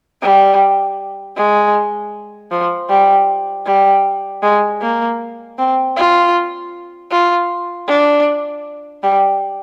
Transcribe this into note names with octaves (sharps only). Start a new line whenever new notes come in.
G3
G#3
F3
G3
G3
G#3
A#3
C4
F4
F4
D4
G3